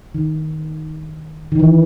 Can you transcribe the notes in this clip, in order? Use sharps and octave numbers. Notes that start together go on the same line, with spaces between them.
D#3
D#3
E3